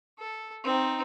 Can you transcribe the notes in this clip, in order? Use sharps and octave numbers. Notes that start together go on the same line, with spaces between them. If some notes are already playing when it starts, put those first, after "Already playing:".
A4
C4 D#4